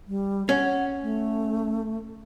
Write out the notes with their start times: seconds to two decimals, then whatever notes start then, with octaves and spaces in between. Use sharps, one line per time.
0.08 G3
0.49 C#4 F#5
1.03 A3